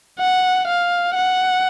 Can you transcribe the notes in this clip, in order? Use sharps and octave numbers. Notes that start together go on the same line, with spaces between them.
F#5
F5
F#5